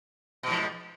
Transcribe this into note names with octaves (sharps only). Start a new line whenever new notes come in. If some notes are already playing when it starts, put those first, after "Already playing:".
G#2 B2 F3